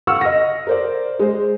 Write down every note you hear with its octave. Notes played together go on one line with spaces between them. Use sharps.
F5 F#5 C#6 E6 F6
D#5 A#6
A#4 C5 D5
G#3 C5